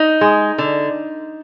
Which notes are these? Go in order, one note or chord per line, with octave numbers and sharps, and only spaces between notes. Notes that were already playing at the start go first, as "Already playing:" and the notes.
Already playing: D#4
G#3
D3